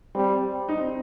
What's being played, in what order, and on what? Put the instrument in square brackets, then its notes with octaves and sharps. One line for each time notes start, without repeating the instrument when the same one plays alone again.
[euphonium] G3 [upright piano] C4
[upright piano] D#4
C4